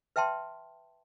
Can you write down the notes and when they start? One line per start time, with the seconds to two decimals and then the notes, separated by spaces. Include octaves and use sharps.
0.16 B4 E5 G5 A5 C6